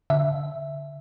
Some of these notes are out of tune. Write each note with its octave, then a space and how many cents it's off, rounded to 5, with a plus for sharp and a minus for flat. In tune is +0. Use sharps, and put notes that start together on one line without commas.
D3 -25 E5 +0